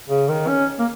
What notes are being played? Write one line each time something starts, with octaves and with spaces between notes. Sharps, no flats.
C#3
D#3
C#4
A#3